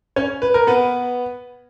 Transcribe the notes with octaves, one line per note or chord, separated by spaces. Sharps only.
C#4 C#5
B4
A#4
B3 B4